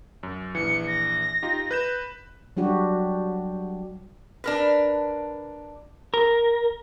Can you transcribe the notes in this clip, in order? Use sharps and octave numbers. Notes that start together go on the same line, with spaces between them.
F#2
A#1 E3 C#7
A#6
D#4 F4 G4
B4 G6 E7
F#3 G3 D4 F#4 G4
D4 A#4 B4
A#4